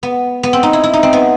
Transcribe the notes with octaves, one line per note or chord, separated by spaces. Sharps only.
B3
B3
C4
D#4
E4
E4
D#4
C4
B3